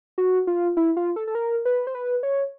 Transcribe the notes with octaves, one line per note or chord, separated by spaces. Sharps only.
F#4
F4
E4
F4
A4
A4
A#4
B4
C5
B4
C#5